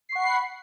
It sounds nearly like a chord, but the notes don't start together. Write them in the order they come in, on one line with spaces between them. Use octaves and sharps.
C7 C#6 F#5 B5